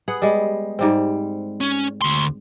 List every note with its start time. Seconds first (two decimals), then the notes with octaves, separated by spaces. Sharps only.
0.08 B3 G#4 F#5
0.22 G3 G#3
0.79 G#2 G3 C4
1.61 C#4
2.02 D2 C6